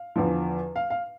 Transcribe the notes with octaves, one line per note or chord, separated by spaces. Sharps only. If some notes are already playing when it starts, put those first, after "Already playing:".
Already playing: F5
E2 D3 F3
F5
F5